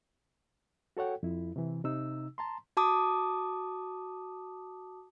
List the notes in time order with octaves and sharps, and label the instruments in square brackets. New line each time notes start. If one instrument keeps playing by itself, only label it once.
[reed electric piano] F#4 A4 C#5 F#5 G5
F2 E4
C3 E3
C3 D#4 E6
A5 A#5 C6
[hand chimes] F#4 A5 D6 D#6